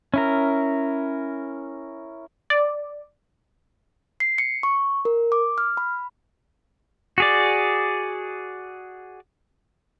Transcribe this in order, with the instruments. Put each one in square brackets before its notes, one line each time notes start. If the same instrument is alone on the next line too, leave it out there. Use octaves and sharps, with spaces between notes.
[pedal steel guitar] C#4 E4 A#4
[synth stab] D5
[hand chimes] C7
C#7
C#6
A#4
D6
F6
B5
[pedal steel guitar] F#4 G#4 D5